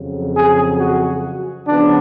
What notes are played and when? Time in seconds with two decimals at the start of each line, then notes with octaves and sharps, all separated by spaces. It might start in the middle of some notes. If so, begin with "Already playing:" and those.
Already playing: F2 C#3 F#3
0.34 G#4
0.79 F#4
1.68 C#3 F3 B3 D4